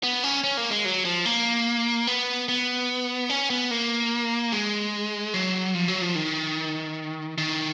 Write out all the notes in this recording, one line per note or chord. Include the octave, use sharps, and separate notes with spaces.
B3
C#4
C#4
A#3
G#3
F#3
F3
A#3
B3
B3
C#4
B3
A#3
G#3
F#3
F3
F#3
F3
D#3
D#3